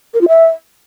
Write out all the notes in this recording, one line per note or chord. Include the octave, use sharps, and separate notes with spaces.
A#4
F4
E5